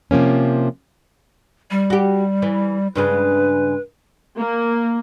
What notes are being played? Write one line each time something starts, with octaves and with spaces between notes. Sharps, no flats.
C3 F3 A#3 C#4
G3
F#4 G4
E3
G2 C#3 G#3 B4
A#3